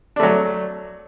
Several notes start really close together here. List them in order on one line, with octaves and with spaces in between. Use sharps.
D4 A3 F#3